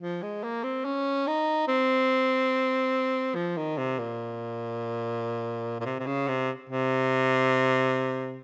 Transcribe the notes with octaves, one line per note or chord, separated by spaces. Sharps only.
F3
G#3
A#3
C4
C#4
D#4
C4
F3
D#3
C3
A#2
A#2
C3
C3
C#3
C3
C3